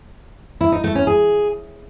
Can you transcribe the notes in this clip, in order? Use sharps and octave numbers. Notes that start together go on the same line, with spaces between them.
E4
D#4
A3
C#4
G#4